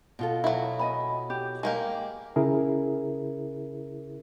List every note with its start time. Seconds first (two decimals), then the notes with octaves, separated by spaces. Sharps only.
0.19 B2 F4 A4
0.44 F#3 E4
0.79 D#5 G#5 B5
1.30 G4
1.63 G#3 A#3 G4 F5 G#5
2.36 C#3 E4 G#4 A#4